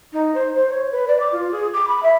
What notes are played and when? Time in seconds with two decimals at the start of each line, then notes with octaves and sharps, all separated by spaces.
0.13 D#4
0.35 C5
0.56 C5
0.70 C#5
0.92 B4
1.08 D5
1.20 D6
1.32 F4
1.51 G#4
1.73 D6
1.88 B5
2.03 E5